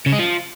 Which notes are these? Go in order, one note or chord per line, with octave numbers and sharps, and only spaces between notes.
C#3
G#3
F3